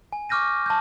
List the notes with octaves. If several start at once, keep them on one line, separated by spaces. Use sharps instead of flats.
G#5
C#6 D6 F6 G6 A#6 D#7
A5 F6 G6